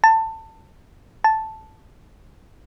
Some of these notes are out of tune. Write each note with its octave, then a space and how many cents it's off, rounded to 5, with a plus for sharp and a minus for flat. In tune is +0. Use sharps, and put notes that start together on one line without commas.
A5 +20
A5 -5